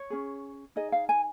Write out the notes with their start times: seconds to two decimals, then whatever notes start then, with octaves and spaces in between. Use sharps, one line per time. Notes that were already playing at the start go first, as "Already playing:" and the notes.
Already playing: C#5
0.10 C#4 G#4
0.76 D#4 G#4 D#5
0.92 F5
1.09 G#5